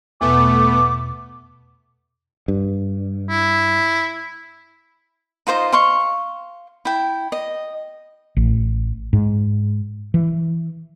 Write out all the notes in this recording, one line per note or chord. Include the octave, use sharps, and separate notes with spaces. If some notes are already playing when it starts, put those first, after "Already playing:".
E2 B2 A3 B3 D6
G2
E4
D#4 F4 C5 D#5
F5 C6 C#6
E4 G5
D#5
A1
G#2
E3